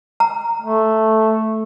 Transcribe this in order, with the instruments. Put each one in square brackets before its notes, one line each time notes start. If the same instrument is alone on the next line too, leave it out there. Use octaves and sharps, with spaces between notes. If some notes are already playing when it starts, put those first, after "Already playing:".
[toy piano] A#5
[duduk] A3